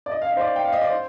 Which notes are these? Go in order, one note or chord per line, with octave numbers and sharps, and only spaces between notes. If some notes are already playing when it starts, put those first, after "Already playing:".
D5
D#5
F5
D#5
C5
D5
G5
F5
D#5
D5
C5